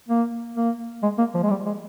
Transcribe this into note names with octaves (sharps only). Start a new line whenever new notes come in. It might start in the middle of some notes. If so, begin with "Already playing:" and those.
A#3
A#3
G#3
A#3
F3
G#3
G3
G#3